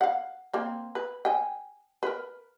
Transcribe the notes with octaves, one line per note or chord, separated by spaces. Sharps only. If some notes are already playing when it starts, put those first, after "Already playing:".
F5 F#5
A#3 C4
B4
G5 G#5
A#4 B4